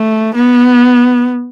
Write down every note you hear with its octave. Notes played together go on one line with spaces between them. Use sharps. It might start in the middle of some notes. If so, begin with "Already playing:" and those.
Already playing: A3
B3